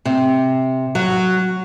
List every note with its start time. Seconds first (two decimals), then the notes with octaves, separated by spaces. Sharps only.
0.05 C3
0.95 F#3